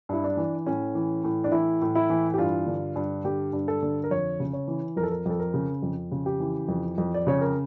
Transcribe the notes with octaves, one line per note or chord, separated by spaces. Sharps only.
G2 E4
D4
E3
A2 C#4
E3
A2
D4
E3 E4
A2
E4
E3
G4
G2 F4
D3
G2
D3 G4
G2
A4
D3
A#4
F2 C#5
C#3
C#5
E3
F2 A#4
A4
A#4
F2 A4
A#4
C#3
F2
C#3
G4
E3
F2
F2
D5
C#3 C#5
A#4